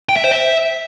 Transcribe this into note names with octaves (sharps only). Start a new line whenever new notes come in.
G5
E5
C5
E5